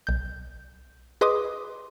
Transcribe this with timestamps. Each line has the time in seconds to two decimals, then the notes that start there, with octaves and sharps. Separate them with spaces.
0.07 B1 G6
1.21 G#4 B4 D#5 C6 D6 D#6